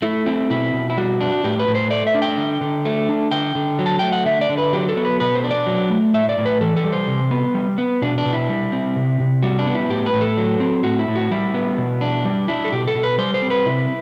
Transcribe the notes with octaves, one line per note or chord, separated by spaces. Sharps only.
A3 E4
C4 E4
B2 E4
B2
E4
G3 F#4
D4
A2 G4
B4
A2
C5
A3 D5
E5
D4
G5
D3
D3
A3
D4
D3 G5
D3
F#3
A5
A3 G5
F#5
D3 E5
D5
D3
B4
F#3 G4
A4
B3
B4
B2 B4
C5
D4
D5
F#3
A3
A2 E5
D5
A2
B4
E3 A4
A4
G3
C5
C3
B3
G3
B3
B2 D4
D4
B2
E4
G3
C4
C3
C3
G3 F#4
D4
B3
E4
A2 G4
B4
A2
A4
F#3
C4
A2 F#4
E4
A2
F#4
G3 E4
B3
B2
D4
G3
D4 E4
A4
B2 G4
A4
B2
B4
G3 C5
C5
C4
B4
C3 E4